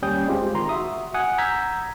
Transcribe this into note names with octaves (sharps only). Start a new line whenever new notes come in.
D#2 G3 C#4 G5 D#6 G6
G#3 C4 F4 G4
G#1 D#3 A#5 C6
F#4 E5 D#6
F#5 G#5 D#6 G#6
A#5 E6 G6 G#6 B6